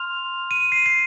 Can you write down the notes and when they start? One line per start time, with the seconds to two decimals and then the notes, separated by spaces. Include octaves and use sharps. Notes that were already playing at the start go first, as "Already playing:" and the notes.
Already playing: C6 F6 F7
0.51 D#7
0.72 C7
0.86 C7